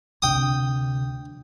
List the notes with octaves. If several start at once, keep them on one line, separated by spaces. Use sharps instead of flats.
D2 C3 D4 G5 D#6